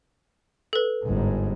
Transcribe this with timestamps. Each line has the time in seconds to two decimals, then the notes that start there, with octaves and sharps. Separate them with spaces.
0.73 A4 B4
1.04 G1 G#2